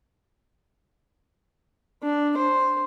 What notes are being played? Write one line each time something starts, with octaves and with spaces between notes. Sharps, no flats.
D4
C5